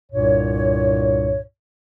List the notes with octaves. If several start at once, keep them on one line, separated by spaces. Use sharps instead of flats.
C2 G2 A#2 C#5